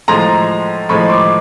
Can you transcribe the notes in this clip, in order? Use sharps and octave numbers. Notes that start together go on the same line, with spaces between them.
A2 F3 G#3 A#5 C6
A2 F3 G#3 B5 C#6
C6 D6